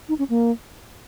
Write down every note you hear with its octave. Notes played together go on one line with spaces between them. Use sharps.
D#4
C#4
A#3